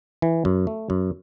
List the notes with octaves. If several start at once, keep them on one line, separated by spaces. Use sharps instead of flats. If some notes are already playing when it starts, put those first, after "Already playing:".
E3
F#2
A3
F#2